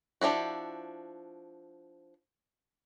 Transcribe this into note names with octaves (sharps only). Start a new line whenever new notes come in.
F3 D4 E4 F#4